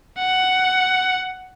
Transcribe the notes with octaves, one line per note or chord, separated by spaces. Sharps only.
F#5